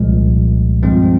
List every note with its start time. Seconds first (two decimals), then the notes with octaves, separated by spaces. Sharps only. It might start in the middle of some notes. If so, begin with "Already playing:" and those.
Already playing: C2 A#2 F3 G#3
0.83 G2 F3 G#3 C4